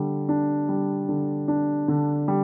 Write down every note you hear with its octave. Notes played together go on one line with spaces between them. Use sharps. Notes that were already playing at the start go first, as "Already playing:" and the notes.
Already playing: D3 G3
D4
G3
D3
D4
D3
G3